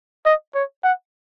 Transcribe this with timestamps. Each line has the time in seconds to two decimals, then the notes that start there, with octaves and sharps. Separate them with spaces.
0.25 D#5
0.55 C#5
0.84 F#5